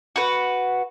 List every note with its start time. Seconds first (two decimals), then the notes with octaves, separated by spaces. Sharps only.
0.16 F#4 B4